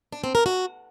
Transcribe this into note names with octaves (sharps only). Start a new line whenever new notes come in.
D4
C4
A#4
F#4